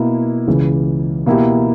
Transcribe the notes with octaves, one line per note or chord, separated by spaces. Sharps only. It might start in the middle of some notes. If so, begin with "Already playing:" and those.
Already playing: B2 A#3 E4
C#2 C#3 E3
B2 A#3 E4 G4